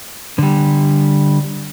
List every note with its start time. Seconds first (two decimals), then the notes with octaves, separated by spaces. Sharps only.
0.39 D3 G3